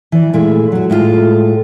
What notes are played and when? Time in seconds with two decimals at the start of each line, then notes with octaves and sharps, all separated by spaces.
0.12 E3 D5
0.33 A#2 G#3 A3 E4
0.72 F#3 F#4
0.90 A2 G#3 E4 F4 A4